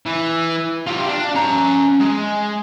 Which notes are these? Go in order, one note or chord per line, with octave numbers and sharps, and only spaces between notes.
E3
F4 G4
D4
C#4 A#5
G#3